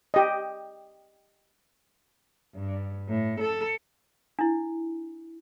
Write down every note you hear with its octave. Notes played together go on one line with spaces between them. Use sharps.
G4 D#5
G2
A2
A4
D4 E4